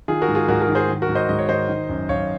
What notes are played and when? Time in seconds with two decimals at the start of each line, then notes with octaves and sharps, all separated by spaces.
0.08 D#3 F4 G#4
0.22 F#4 A#4
0.28 G#2
0.35 F4 G#4
0.48 G#2 F#4 A#4
0.62 F#4 A#4
0.68 D#3
0.75 G#4 C5
0.88 D#3
1.02 F#4 A#4
1.09 G#2
1.15 C5 D#5
1.29 G#2 D#5
1.39 C#5
1.49 D#3 C5 D#5
1.68 D#3
1.89 F#2
2.09 F#2 C#5 F5